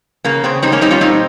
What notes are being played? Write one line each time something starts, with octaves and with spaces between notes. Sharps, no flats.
C#3 A#3
C#3 C4
G3 C4 D#4
A#3 C#4
G3 C4 D#4
C#4 F4
A#2 C4 D#4